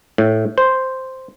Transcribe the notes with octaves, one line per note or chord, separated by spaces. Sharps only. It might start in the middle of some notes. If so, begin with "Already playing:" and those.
A2
C5